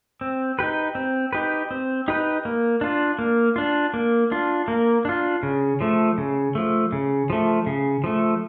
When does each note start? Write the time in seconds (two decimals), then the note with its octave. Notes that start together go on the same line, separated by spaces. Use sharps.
0.21 C4
0.59 D#4 G4 B4
0.95 C4
1.33 D#4 G4 B4
1.71 C4
2.08 D#4 G4 B4
2.45 A#3
2.81 D4 F4
3.19 A#3
3.56 D4 F4
3.94 A#3
4.32 D4 F4
4.68 A#3
5.05 D4 F4
5.43 C#3
5.81 F3 A3
6.18 C#3
6.55 F3 A3
6.92 C#3
7.30 F3 A3
7.66 C#3
8.04 F3 A3